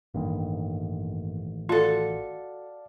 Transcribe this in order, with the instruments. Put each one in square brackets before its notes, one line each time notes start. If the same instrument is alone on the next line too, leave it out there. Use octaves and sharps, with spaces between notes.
[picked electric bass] A1 D#3 [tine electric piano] G2 A#3
[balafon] F4 [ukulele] F#4 A4 [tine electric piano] D5 F5 A5